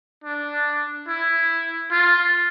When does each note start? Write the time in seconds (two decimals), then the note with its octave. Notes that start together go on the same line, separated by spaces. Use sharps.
0.24 D4
1.08 E4
1.91 F4